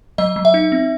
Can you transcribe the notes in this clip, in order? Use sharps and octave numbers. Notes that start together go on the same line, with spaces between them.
F#3 D#5
F#3
E5
D#4
C4